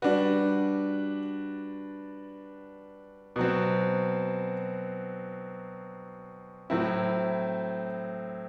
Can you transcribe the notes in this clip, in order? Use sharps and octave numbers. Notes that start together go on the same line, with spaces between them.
G3 D4 F#4 B4
B2 F#3 C4
A2 F#3 C4 E4